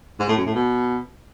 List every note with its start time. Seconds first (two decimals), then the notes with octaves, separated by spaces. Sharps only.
0.20 G#2
0.28 A2
0.37 F#2
0.46 A2
0.55 B2